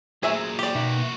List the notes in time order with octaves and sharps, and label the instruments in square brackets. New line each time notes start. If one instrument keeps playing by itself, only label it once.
[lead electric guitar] A#2 F#3 [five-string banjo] A3 E5 G#5 [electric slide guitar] G#4 C5
[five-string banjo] G4 D5
[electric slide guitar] B2 D#4 E5 [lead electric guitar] A#3 F#4